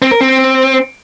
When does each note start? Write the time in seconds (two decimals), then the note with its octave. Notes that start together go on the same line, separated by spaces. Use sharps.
0.02 C4
0.11 A#4
0.21 C4